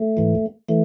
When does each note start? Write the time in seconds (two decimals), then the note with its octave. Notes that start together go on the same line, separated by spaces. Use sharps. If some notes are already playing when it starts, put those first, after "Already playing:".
Already playing: A3
0.17 G#2 E3
0.69 E3 A3